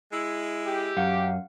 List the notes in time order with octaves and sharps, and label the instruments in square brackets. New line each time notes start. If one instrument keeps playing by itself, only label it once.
[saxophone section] G#3 E4
[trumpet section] G4
[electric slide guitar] F#2 [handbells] F5 F#5